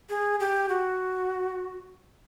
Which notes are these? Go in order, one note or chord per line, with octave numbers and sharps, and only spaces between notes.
G#4
G4
F#4